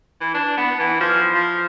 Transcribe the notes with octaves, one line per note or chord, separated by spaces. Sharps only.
E3
D4
B3
E3
F3
F3